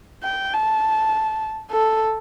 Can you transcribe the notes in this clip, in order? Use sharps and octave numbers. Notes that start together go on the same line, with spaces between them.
G5
A5
A4